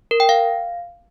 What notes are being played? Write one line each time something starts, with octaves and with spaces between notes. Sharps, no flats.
A#4
G5
F5